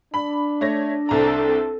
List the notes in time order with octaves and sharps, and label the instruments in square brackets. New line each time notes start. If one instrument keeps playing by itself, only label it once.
[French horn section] D4 [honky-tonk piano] B5
[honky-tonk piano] A3 C#5 A#6
[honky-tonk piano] C2 A#5 [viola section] C4 A4